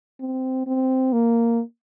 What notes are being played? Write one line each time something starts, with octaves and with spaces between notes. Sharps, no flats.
C4
C4
A#3